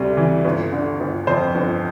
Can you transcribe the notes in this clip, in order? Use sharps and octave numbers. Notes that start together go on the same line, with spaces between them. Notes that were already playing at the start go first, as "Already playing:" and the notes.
Already playing: D2 C3 G3
E3
G1
D3
G1
F2 C5
G1